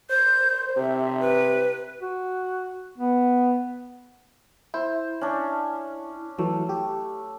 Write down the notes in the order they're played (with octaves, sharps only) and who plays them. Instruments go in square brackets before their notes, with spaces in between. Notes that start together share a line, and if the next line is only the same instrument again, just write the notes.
[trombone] C5 [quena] G6
[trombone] C3 [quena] E5
[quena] B4
[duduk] F#4
B3
[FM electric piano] E4 [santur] C5
[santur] C#4 D4
[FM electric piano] E3 F#3 [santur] A3
[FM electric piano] G4